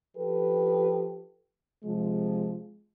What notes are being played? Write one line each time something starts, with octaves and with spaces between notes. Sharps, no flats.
F3 G4 A4 B4
C3 F3 G#3